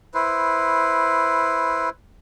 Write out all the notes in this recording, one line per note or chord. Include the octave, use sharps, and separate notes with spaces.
E4 B4 C5